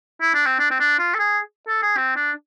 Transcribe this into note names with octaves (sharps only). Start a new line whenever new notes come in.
E4
D4
C4
D4
C4
D4
F4
A4
G#4
A4
G#4
C4
D4